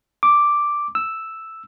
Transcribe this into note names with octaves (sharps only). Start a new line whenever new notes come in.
D6
E6